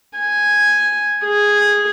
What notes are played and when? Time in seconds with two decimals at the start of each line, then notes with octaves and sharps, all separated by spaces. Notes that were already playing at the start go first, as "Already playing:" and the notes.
0.18 G#5
1.26 G#4